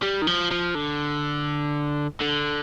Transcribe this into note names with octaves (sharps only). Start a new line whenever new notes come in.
G3
D#3
F3
F3
D3
D3